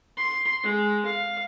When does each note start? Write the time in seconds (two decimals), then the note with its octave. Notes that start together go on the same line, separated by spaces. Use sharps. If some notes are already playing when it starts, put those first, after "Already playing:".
0.17 C6
0.64 G#3
1.05 F5